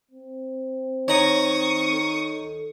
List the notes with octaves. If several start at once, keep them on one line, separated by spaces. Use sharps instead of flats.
C4
D#3 C#5 A#5 C#6 D#6
A4